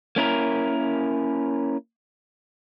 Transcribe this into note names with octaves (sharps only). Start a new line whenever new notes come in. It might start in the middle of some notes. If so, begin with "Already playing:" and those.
A#3 C#4 E4 A#4